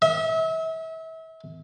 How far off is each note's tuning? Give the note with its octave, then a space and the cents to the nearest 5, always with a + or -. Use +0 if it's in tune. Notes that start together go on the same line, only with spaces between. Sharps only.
E5 -35